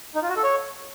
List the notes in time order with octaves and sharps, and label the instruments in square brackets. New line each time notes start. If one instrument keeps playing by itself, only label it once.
[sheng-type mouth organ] D#4
F4
F#4
A4
C#5